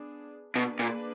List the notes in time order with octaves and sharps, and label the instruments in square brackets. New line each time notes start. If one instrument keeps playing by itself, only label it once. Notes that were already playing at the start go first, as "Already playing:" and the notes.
Already playing: [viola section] B3 D4 G#4
[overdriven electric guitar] B2 [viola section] A#3 D4 G#4 B4 D5
[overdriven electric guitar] A#2